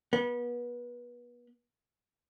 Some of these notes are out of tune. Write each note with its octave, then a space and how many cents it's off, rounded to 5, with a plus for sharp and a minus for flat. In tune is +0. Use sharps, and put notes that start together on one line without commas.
B3 -30